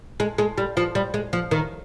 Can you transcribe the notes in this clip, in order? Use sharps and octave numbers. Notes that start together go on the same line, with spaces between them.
G#3
G#3
G3
F3
G3
G#3
F3
D#3